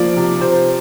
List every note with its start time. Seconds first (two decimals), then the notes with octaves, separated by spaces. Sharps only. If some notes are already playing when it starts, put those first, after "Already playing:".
Already playing: F3 A#3 D5
0.16 C3
0.41 C3 C5